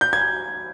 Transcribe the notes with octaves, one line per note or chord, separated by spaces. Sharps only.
G6
G#6